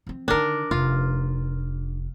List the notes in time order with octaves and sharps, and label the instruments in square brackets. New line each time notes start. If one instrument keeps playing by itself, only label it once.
[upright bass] F3 C4
[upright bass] D3 D#3 [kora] D4 A#4
[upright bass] F1 [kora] F4